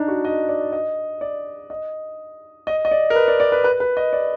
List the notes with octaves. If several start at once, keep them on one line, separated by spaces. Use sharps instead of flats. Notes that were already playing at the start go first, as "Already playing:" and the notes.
Already playing: D4 D#4
F#4
D#5
D5
D#5
D5
D#5
D#5
D#5
D5
A#4
B4
D5
D5
B4
B4
B4
D#5
D5